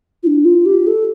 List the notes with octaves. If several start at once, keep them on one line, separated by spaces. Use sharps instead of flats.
F4
D4
F4
G4
A4